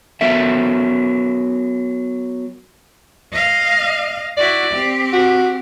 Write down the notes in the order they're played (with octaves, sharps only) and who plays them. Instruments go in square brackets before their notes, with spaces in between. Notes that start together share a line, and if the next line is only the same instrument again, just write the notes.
[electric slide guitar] F#3 B3 A#4 E5
[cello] D#5 F5
[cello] E4 F#4 [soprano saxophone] D5
[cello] C4 G4
[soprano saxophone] F#4